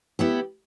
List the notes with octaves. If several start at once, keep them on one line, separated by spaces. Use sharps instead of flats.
B3 E4 G4